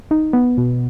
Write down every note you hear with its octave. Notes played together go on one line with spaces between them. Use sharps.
D#4
B3
B2